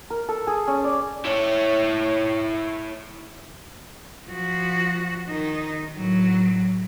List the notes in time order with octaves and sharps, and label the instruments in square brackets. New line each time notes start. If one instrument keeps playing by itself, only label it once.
[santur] A#4
A4
G#4
C#4
D5
[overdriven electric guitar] E4 C#5
[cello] F3 F#4
D#3 D#4
A2 F#3